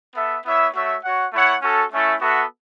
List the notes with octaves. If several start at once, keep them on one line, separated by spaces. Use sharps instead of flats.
B3 A4 E5
B3 E4 C#5 E5
A3 F#4 C#5 E5
F#4 C#5 F#5
A3 E4 C#5 F#5
C#4 F#4 A4
A3 C#4 E4 A4 E5
B3 F#4 A4 E5